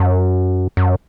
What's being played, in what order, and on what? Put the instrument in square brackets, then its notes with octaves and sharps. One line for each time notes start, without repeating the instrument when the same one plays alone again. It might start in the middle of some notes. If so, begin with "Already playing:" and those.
Already playing: [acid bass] F#2
F#2